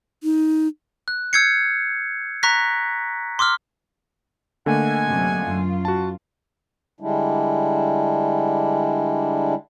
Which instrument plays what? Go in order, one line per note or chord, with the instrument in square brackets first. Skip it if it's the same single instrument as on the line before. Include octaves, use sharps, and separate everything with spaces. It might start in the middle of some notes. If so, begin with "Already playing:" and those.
[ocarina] D#4
[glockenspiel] F#6
E6 G6 G#6 C7 C#7
A#5 C#6 F#6 A#6 B6
C6 D6 E6 F6
[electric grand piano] D3 A3 A#3 [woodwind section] D#5 F#5 G#5
[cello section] F#2 C3
F#2 F4
[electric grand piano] F#4 A5
[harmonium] D3 G3 G#3 D4 E4